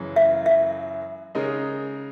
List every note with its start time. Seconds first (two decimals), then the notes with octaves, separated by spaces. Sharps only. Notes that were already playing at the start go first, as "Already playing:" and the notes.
Already playing: F#2 C#3 E3 G#3
0.16 E5
0.46 E5
1.35 C#3 G#3 D#4 A#4